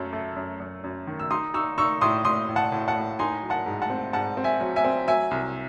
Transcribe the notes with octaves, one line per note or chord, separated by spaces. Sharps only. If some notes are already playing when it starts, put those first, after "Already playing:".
Already playing: F#2 F#3 A3
A3
F#2
F#2
F#2
D#3
E6
D#4 C6 D#6
D#4 C#6 E6
D#4 C#6 E6
A2 C6 D#6
A2 C6 D#6
A2
F#5 A5
A2
F#5 A5
A2
D#4 G#5 C6
F#3
F#5 A5
G#2
F#5 A5
C4
G#2 F#5 A5
C4
E5 G#5
F#3
E5 G#5
C4
F#3 E5 G#5
C2